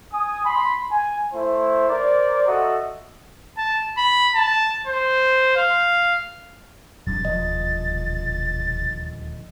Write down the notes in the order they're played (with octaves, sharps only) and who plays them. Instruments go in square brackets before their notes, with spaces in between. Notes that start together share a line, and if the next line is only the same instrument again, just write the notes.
[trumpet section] G#5 D#6
B5 C6
G#5
A3 E4 C5
A#4 C5 D5
F#4 A4 D#5 E5 F#5
[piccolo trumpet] A5
B5
A5
C5
F5
[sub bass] E1 [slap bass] F2 G3 D4 [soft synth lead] A6
[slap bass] D#1 D2 F3 [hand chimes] D#5